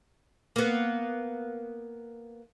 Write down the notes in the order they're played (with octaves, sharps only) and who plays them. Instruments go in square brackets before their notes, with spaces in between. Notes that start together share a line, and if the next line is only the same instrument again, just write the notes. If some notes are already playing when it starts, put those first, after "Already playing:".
[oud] A#3 B3